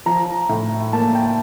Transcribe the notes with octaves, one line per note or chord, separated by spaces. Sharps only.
F3 A#5
A2
A#3 A5
G5